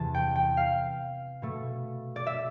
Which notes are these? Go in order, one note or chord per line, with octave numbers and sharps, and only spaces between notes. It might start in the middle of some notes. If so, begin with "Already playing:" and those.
Already playing: E2 C3 E3 A5
G5
G5
F5
B2 A3
D5
E5